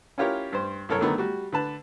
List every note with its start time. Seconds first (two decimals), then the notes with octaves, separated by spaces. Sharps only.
0.18 C#4 E4 F4 G4 A#4 C#5
0.52 G2 C5
0.89 C2 F#2 A4 A#4 C#5
1.01 D3 D#3 F#3 A3 B3
1.18 G3 F#4
1.52 D3 B4 A5